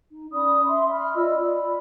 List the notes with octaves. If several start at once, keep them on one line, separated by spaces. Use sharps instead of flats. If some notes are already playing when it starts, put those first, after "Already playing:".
D#4
C#4 D5 B5 D#6
E5 C6
B5 F6
F4 D5 D#5 E6
D5 B5